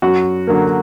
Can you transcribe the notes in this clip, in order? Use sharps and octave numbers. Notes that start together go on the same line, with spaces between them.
F#2 F#4
D3 F#3 A#3